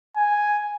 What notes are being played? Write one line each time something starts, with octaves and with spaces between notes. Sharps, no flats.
G#5